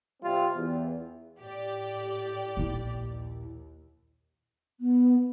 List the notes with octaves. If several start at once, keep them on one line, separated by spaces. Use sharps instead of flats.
C3 G3 C4 F4
E2
A2 G4 D5
A#1 E4
D#2
B3